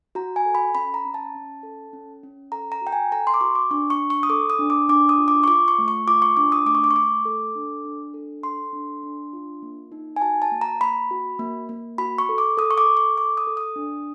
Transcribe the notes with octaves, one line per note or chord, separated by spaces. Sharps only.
F#4 A#5
G#5
A4
B5
C#4 B5
A#5
C#4
A5
C#4
A4
C#4
C#4
A4 A#5
A#5
F#4
G5
G#5
A4 A#5
C6
D6
F#4 C#6
D6
D4 C#6
C#6
D4
C#6
D#6
A4 D6
D#6
D4
D6
D4 D6
D#6
F4
D6
C#6
F4 D6
C#6
A3
C#6
F4 D6
C#6
D4 D6
D#6
A3 D6
C#6
D6
C#6
A3 D6
A4
D4
D4
A4
A4 C6
D4
D4
F4
A#3
D#4
G#5
F#4 A5
A5
A#3
A#5
A#3 B5
F#4
A#3
A#3
F#4 B5
C#6
A4
D6
A4 D#6
C#6
D6
A4
C#6
A4 D6
D#6
A4
D#6
D4